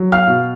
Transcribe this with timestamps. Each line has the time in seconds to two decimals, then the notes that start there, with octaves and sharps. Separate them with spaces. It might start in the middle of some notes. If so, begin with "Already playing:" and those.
Already playing: F#3
0.12 F5 F6
0.27 B2